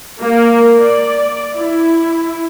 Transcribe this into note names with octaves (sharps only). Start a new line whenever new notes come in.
A#3
D5
E4